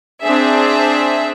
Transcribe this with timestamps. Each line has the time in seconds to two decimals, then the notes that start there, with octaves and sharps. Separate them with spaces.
0.22 C4 D4 G#4 E5